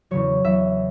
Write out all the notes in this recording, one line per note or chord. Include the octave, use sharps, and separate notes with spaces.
E2 C#3 F#3 C#5
E2 C#3 F#3 E5